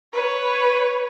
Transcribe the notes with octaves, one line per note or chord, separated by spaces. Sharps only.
B4 C#5